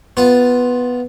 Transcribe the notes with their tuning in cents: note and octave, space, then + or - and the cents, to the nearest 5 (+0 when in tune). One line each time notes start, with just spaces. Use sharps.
B3 +0 F4 +5 B4 +0